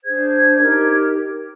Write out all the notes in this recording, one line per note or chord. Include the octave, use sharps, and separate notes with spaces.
D4 G#4 C5 G#6
D#4 G4 A#4